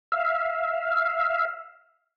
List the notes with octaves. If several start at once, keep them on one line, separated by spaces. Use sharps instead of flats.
E5 F5